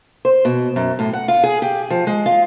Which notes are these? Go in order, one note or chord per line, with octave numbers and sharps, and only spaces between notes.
C5
B2
F#2
A2
F#5
F4
G#4
G4
F3
G#3
F4